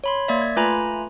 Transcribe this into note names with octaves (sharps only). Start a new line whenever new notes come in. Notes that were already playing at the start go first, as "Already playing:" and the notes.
C#5 B5 C6
A#3 D5 E5
G#6
A3 F4 B4 G#5 A#5 B5